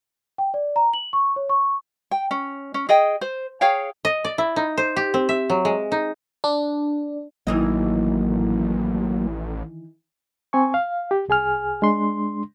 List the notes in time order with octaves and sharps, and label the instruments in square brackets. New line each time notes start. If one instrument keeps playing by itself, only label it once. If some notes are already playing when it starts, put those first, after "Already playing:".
[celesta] G5
D5
A#5
F#7
C#6
C#5
C#6
[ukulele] G5
C#4
C#4
G#4 D#5 G5
C5
G#4 C#5 F5 G5
[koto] D#5
D5
E4
D#4
C5
G4
C4
E5
F#3
G#3
D#4
[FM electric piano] D4
[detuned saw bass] A1 [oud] D#3 E3 D#5 [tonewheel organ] F#3 A#3
[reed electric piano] C4 G#5 C#6
F5
G4
C2 G#4 G#5 F6
G#3 D4 C6